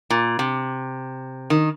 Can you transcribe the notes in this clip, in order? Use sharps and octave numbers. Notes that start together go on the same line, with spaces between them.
A#2
C3
D#3